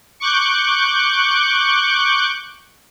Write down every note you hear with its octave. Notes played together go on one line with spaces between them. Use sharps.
C#6 D6 F#6 G6